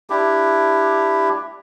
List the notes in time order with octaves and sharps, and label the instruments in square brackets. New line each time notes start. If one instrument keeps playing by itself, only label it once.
[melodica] D4 E4 G4